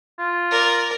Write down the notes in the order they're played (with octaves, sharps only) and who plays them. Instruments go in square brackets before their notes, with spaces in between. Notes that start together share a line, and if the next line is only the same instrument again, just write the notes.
[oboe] F4
[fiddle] A#4 D5